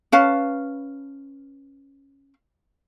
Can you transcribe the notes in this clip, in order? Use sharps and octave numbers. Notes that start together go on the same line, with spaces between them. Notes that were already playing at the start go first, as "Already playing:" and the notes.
C#4 B4 F5 A5